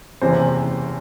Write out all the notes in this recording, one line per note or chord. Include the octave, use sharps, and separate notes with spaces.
F#1 E2 C3 E3 C5